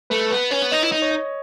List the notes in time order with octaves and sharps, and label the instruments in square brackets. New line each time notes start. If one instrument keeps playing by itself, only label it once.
[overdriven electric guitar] A3 [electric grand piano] B4
[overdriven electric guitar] B3 [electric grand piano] B4
[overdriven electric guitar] C#4 [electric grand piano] C#5
[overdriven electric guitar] B3
[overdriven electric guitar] D#4 [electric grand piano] D#5
[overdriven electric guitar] E4
[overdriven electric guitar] D#4 [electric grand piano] D#5
[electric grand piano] C#5
D#5